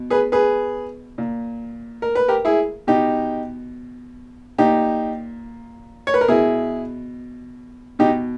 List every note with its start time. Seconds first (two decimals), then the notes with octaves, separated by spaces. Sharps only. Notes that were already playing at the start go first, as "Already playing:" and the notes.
Already playing: B2
0.10 G#4 B4
0.32 G#4 B4
1.18 A#2
2.02 A#4
2.15 B4
2.28 G4 A#4
2.45 E4 G#4
2.87 B2 D#4 G4
4.58 A#2 D#4 G4
6.07 C#5
6.14 B4
6.21 A#4
6.28 B2 E4 G#4
7.99 B2 D#4 G4